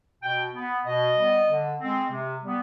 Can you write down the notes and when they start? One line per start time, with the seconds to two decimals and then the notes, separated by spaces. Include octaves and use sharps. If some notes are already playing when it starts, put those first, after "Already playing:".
0.22 B2 G5
0.54 B3
0.85 B2 D#5
1.17 G3 B3
1.48 D3
1.80 G#3 C4
2.10 C3
2.42 G3 B3